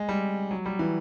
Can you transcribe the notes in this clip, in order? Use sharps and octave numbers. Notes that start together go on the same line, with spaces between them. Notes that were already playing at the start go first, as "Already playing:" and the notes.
Already playing: G#3
G3
F#3
G3
E3